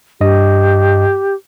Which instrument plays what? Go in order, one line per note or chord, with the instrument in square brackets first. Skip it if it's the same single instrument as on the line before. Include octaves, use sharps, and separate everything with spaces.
[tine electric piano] G2 D#5 [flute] G4